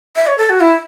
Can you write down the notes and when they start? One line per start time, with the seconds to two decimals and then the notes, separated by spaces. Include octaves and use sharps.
0.16 E5
0.27 C#5
0.38 A4
0.50 F#4
0.60 E4